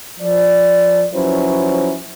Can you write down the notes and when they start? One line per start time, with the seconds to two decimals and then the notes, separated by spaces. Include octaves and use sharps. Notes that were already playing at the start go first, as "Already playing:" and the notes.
0.20 F3 D5
1.14 F3 F#3 C#4 E4 B4 C5